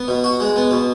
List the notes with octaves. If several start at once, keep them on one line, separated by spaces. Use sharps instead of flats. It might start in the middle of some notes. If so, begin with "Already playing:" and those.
Already playing: B3
B2
F#4
G#3
B3
B2